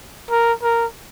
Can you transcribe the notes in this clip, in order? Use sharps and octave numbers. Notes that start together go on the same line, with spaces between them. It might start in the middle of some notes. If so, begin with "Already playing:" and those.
A#4
A#4